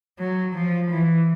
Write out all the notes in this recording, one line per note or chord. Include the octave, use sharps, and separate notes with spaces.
F#3
F3
E3